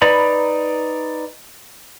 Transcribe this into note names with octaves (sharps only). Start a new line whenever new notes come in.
D#4 B4 D5 A#5 B5